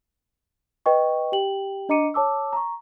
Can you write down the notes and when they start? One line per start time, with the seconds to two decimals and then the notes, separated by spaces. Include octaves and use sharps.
0.86 B4 D#5 G5 C#6
1.32 G4 G5 F#7
1.89 D4 D#5 A#5 D6 C#7 D#7
2.14 C#5 A5 D6 E6
2.53 A#5 C#6